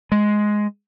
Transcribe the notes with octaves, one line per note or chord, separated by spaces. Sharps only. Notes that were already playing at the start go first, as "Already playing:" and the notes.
G#3